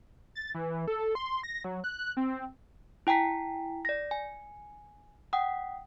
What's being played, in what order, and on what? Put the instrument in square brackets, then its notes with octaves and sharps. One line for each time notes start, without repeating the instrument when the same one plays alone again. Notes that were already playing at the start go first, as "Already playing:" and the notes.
[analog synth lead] A6
E3
A4
C6
A#6
F#3
F#6
F#6
C4
[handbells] E4 G5 G#5 A#5 B6
D5 A#6
G#5
F#5 G5 D#6